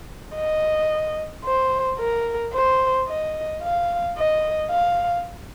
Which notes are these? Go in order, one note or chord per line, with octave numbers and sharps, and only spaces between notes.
D#5
C5
A#4
C5
D#5
F5
D#5
F5